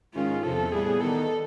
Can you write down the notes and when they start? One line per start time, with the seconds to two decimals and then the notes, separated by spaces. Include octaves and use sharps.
0.14 G#2 D#3 G#3 C#4 F4
0.43 E2 C3 F3 A4
0.71 A2 E3 G3 B3 G#4
1.00 D#3 G3 B3 D#4 A4